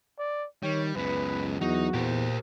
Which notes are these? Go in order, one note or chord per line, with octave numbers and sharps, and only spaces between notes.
D5
D#3 G3 C#5
C#2 F#2 B3 B4
E2 F#3 D#4 F#4
E2 A#2 G4 A#4 C5